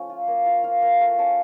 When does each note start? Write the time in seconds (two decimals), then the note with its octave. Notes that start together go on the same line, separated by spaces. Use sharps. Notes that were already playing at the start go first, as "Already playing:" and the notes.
Already playing: F3 A3 C#4 C#5
0.09 F4
0.28 A#3
0.45 F4 F5
0.64 F4 F5
0.82 A#3 F5
1.01 A3 F5
1.18 C#4 A5